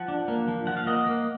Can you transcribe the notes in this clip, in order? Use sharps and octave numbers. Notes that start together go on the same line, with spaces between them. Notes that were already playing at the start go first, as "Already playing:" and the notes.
Already playing: F3 F#5
D4
A#3
F3
F3 F#5
F5
A#3 D#5 F#5
A#3